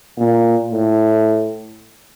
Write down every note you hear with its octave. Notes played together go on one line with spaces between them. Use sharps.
A#2
A2